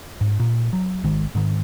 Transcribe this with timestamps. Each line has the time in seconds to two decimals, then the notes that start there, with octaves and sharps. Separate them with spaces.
0.21 G#2
0.40 A#2
0.73 F#3
1.04 G#1 D#3 G#3
1.35 G#2 D#3